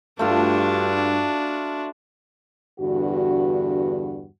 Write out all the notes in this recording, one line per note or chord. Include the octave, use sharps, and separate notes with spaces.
G2 A3 D4 F4 F#4
E2 G2 D3 F#4